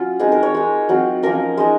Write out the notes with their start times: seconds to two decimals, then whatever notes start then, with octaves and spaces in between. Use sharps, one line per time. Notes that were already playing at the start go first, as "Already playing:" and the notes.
Already playing: F#3 C#4 F4
0.20 G#3 C4 D#4 G#4
0.32 A#4
0.43 C#5
0.54 G#3 D#4
0.89 F#3 C4 F4
1.23 F3 A#3 C#4 A#4
1.58 G#3 D#4